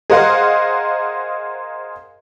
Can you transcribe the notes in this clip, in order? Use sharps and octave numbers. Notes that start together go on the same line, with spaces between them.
G#4 A#4 C5 D#5 F5 F#5